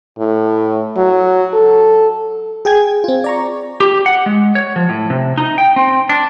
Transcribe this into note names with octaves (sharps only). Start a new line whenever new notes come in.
A2
F#3
A4
G#4 G5 G#5 G#6
C4 F4
D5 A#5 C#6
G4
F#5
G#3
C#5
F3
A2
C3
D#4
G5
C4
D4